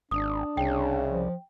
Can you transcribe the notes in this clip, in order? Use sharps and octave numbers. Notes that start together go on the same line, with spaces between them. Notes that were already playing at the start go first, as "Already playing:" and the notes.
G#1 D4 D#6
C2 C#3 G5
F3